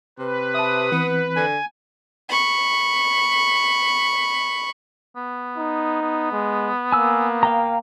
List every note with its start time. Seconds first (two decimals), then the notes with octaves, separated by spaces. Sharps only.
0.19 C3 B4
0.54 E5 A5 D#6
0.92 E3 B3 C4
1.36 D3 G#5
2.29 B5 C#6
5.16 B3
5.58 D#4
6.02 B3
6.32 G#3
6.92 A#3 G#5 E6
7.43 F5 G5 A#5